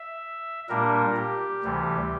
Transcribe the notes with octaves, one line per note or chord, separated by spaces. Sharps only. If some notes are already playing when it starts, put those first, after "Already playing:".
Already playing: E5
A#2 G3 A#3 D4 A#4
G4
D2 C3 E3 G3